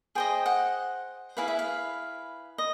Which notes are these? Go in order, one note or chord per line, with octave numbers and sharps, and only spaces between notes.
G#4 C5 D#5 G5
F#5
E4 G#4 B4 F5
E5
F5
D#5